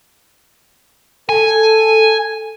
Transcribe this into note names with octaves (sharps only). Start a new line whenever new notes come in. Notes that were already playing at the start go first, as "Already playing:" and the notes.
A4 G#5